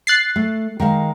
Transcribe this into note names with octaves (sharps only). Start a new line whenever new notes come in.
F#6 A6 C7
A3
D#3 G#3 F5